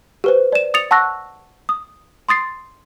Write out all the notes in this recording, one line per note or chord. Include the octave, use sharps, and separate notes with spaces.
G4 B4 C5
D5 E7
D#6 A6 C#7 F7
F#5 A5 C#6 E6 F#6 A#6
D#6
C6 D#6 A6 C7